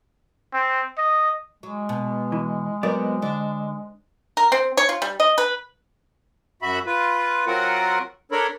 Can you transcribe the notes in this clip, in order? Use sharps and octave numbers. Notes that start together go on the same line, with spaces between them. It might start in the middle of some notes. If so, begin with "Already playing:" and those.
C4
D#5
F#3 G#3
B2
E3
F#3 B3 C4 A#4 D5
D3 D4
A#4
C4
C#5
F4
G3
D#5
B4
F#2 F#4 E5 B5
F4 B4
F#3 C4 F4 F#4 A#4 F#5
D4 A4 A#4 C#5 B5